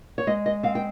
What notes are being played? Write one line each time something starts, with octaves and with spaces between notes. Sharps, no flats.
C#5
G#3 D#5
D#5
C4 F5
G5